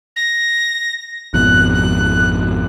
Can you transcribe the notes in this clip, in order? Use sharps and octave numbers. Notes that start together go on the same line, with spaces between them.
A#6
G#1 F2 B2 F#6
F#6